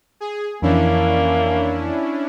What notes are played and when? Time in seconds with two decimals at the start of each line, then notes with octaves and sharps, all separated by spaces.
0.20 G#4
0.62 F2 E3 A#3 C#4 D4 E4